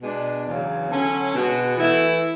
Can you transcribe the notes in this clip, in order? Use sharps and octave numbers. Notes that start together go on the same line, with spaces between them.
B2 G#3 D4
E2 C#3 F#3
D3 F#3 C#4
B2 G#3 B3 F#4
E3 A3 E4